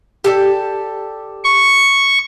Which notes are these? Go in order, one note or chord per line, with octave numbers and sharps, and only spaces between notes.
G4 A4 D5
C#6